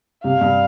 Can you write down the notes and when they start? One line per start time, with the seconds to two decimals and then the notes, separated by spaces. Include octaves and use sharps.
0.24 G2 C3 F5
0.41 G2